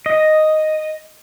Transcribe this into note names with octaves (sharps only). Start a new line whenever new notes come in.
D#5